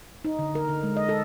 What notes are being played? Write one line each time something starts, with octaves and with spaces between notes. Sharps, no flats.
D#4
D3
A#4
D3
G#3
D#5
A4